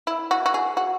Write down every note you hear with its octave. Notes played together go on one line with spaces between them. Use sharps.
E4
F#4
F#4
G#4
F#4